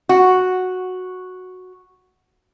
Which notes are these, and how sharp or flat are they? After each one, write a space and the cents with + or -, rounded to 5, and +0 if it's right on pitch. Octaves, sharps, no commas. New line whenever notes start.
F#4 -5